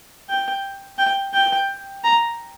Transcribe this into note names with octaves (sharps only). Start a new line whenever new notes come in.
G5
G5
G5
A#5